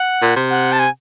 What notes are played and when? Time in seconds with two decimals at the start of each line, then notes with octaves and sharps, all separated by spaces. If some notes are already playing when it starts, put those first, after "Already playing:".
Already playing: F#5
0.22 A#2
0.36 C3
0.50 F#5
0.72 A5
0.79 G#5